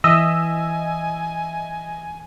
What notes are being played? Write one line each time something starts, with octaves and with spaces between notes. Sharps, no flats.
E3 D#5 E5 G#5 E6